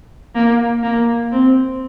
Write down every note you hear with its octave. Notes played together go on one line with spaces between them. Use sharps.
A#3
A#3
C4